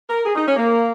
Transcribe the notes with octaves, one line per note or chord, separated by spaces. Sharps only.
A#4
G#4
D#4
C#4
A#3